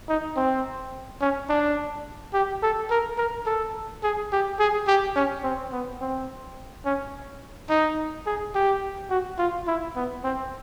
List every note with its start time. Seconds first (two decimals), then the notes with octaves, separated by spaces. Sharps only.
0.09 D#4
0.36 C4
1.21 C#4
1.49 D4
2.34 G4
2.63 A4
2.90 A#4
3.18 A#4
3.46 A4
4.03 G#4
4.32 G4
4.59 G#4
4.87 G4
5.15 C#4
5.43 C4
5.72 B3
6.01 C4
6.85 C#4
7.69 D#4
8.26 G#4
8.55 G4
9.10 F#4
9.38 F4
9.67 E4
9.96 B3
10.24 C4